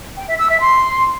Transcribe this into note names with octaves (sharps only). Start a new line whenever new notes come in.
G5
E5
E6
E5
C6